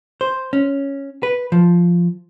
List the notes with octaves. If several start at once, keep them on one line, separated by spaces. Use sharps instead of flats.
C5
C#4
B4
F3